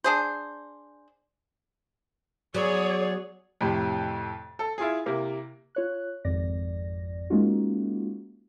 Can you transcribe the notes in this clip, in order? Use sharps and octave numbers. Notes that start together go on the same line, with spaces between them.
D4 G#4 C5
F#3 B3 G#4 C#5 D5
F2 A2 C3
A4
E4 F4 G#4
C3 A#3 E4
F4 C#5 F#6
G#1 F2 D5 A#6
G#3 A#3 C#4 D#4 F4 F#4